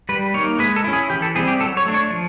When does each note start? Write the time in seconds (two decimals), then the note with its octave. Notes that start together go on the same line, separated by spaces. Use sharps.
0.09 G3 B4
0.34 A#3 D#4 C#5
0.59 G#3 B4
0.76 A4
0.84 C#4 E4
0.93 G#4
1.10 E3 G4
1.22 A4
1.35 G3 C4 E4 G#4
1.48 G4
1.61 F#3 A4
1.77 C#5
1.86 A3 D4
1.94 C#5
2.11 F3